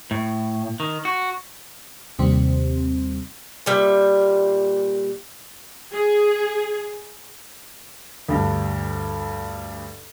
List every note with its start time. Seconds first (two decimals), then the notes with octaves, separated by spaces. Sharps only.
0.11 A2
0.80 D#3
1.05 F#4
2.19 D#2 C3 G3 C4
3.66 A#2 G3 E5
5.94 G#4
8.29 D2 G2